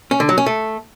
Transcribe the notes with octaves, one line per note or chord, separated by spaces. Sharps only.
C#4
D3
F#3
C#4
A3